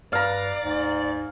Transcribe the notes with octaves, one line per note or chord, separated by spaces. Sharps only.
G2 B4 D5 F5 A#5
D2 G#2